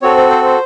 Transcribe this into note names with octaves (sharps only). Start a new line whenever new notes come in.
C4 F#4 A4 C#5
C5
C5
C5